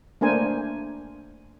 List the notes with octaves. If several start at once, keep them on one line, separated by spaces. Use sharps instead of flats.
A3 A#3 D4 A#4 C5 G#5